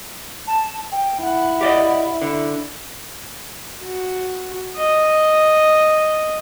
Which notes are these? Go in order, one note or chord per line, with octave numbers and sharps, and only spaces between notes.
A5
G5
E4 F#5
G4 D5 D#5
D3
F#4
D#5